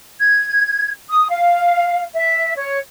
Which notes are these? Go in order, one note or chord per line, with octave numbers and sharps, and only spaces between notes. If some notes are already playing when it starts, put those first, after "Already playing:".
G#6
D#6
F5
E5
C#5